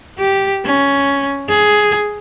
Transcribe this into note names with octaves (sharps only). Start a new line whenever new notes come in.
G4
C#4
G#4